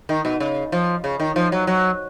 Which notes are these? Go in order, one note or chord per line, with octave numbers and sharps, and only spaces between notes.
D#3
B2
C#3
F3
C#3
D#3
F3
F#3
F#3